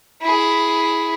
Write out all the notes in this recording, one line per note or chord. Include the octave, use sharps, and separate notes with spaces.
E4 G#4